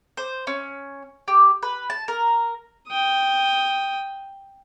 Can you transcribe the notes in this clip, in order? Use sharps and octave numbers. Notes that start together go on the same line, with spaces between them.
C5
C#4
G4
B4
A5
A#4
G5 D#6